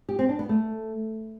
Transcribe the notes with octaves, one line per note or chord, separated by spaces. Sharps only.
G4
C4
D4
B3
A3